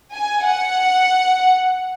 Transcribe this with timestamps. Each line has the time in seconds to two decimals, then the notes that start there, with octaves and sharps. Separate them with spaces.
0.14 G#5
0.45 F#5